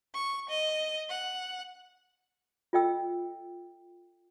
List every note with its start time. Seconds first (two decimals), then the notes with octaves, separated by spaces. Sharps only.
0.14 C#6
0.49 D#5
1.09 F#5
2.73 F4 A4 D#5 G5 E6